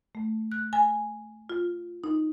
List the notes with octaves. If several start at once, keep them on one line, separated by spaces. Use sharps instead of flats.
A3
F#6
G#5
F4
D#4